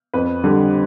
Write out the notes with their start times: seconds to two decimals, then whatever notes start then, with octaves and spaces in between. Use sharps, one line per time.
0.14 F2 B4
0.44 D3 G3